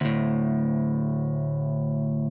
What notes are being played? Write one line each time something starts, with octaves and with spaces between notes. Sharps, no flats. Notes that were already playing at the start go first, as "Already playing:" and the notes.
D2 A2